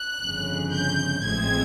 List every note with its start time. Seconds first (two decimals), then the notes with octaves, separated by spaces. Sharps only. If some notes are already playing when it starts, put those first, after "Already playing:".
Already playing: F#6
0.22 G1 F2 C#3
0.73 G6
1.24 A1 A2 F3 G#3 C4 G#6